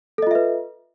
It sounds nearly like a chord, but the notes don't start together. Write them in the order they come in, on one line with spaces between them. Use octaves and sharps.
A4 D#5 F4 E5 B4